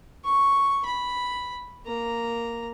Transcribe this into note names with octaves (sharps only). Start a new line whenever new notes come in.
C#6
B5
A#3 A#5